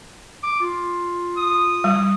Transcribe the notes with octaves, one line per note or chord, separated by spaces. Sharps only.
D6
F4
D#6
G3